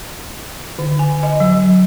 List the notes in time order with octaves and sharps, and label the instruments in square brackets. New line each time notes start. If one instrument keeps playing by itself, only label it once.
[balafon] D3
G#5
D#5
F#3